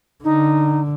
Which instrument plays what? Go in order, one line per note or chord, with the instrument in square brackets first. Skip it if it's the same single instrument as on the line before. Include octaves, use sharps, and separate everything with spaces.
[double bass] D3 [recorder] D#4